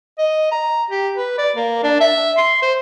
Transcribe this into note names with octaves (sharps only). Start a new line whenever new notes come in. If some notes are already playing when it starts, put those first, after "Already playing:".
D#5
A#5
G4
B4
D5
A#3
D4
E5
C6
C5